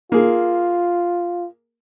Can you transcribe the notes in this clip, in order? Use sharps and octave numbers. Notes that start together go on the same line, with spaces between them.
A#3 F4 G#4